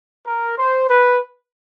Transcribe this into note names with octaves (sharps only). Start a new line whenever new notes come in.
A#4
C5
B4